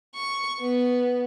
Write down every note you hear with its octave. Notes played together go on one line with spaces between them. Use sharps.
C#6
B3